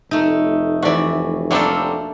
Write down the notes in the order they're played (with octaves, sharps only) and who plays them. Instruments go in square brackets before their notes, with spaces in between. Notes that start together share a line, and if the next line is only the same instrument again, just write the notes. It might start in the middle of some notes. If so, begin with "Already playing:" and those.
[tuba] F1 [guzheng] A3 D#4
[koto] C3 E3 [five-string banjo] F#4 D5
[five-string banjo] F#3 G3 C4 [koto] A#3 D4 A4 [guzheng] E5 F5